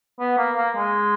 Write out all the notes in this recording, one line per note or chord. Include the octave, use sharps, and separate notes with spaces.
B3
A#3
A#3
G#3